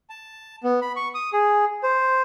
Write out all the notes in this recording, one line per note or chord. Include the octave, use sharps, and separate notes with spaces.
A5
B3
B5
C#6
D#6
G#4
C5